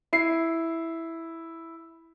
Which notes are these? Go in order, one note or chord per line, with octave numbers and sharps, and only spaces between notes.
E4 C7